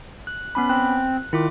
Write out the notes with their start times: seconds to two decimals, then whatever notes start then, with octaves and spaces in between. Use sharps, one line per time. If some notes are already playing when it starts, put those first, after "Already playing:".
0.27 F#6
0.55 B3 C#4 B5
0.70 C4 F#6
1.33 D#3 E4 F4 D6